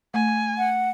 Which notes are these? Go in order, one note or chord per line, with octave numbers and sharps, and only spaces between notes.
A3 G#5
F#5